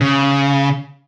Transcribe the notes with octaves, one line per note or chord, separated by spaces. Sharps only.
C#3